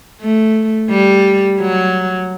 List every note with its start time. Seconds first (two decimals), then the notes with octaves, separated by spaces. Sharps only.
0.21 A3
0.90 G3
1.61 F#3